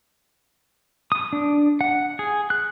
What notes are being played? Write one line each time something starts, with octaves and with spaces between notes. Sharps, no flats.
D#6
D4
F#5
G#4
F#6